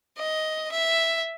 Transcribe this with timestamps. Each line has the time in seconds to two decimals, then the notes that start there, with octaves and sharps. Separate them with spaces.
0.18 D#5
0.71 E5